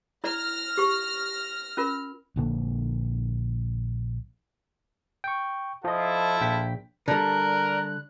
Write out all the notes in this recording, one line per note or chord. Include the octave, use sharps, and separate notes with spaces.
E4 D5 F6 A#6
G4 C#6
C#4 F4 A#4
A#1 D3 A#3
G5 C#6
F3 E4 F4 A4 D#5
A#1 G5 B6
D3 G3 A#4 D5 F#6